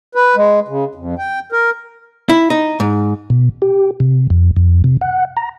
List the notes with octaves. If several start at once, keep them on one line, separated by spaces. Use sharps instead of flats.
B4
G#3
C#3
F2
G5
A#4
E4
D#4
G#2
B2
G4
C3
F2
F2
C3
F#5
A#5